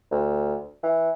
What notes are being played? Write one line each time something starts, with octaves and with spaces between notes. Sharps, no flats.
D2
E3